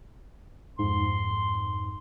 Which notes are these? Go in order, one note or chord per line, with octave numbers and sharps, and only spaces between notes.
F2 G#2 C6